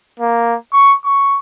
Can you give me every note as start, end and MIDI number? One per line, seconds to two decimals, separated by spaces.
0.20 0.55 58
0.73 0.92 85
1.04 1.38 85